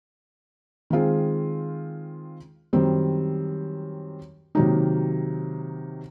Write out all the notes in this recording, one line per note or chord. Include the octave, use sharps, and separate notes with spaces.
D#3 G#3 C4 F4 G#4
F#2 D#3 G3 C4
C3 D#3 F#3 A#3 D#4